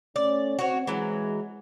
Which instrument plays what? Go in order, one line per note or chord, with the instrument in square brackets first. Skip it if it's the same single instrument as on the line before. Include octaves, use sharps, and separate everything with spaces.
[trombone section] A3 C#4 [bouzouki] D5
[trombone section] C4 [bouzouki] F#4 C#5
[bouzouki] E3 F#3 [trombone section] G#3